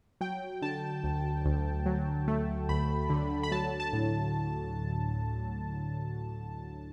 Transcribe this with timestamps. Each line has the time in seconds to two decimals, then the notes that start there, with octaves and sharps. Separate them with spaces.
0.21 F#3 G5
0.62 D3 A5
1.03 D2
1.45 D2
1.86 F#3
2.28 A3
2.69 D2 B5
3.10 D3
3.43 B5
3.52 F#3 A5
3.80 A5
3.93 A2